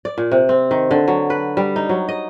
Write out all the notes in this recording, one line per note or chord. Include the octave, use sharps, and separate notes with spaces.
D5
A#2
C3
C4
D#3
D3
F#3
B4
G3
D#4
F#3
D#5